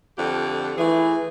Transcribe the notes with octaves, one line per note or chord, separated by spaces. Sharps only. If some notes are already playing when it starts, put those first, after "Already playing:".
F2 D3 G4
E3 A3 G#4